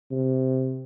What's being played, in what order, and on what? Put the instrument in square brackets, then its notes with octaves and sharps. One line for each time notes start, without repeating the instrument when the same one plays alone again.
[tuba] C3